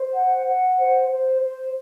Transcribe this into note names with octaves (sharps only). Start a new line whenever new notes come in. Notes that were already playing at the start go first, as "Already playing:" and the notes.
Already playing: C5
F#5
F#5
C5
C5
C5